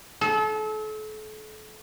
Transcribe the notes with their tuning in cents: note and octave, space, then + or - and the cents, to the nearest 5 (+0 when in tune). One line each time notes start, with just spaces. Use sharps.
A4 -35